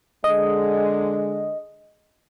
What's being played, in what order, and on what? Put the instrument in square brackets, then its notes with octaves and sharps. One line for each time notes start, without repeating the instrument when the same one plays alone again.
[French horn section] D3 G#3 [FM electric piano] D#5